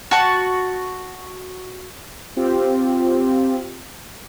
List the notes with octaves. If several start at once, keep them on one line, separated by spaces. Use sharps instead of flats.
F#4 A5
C4 F4 G4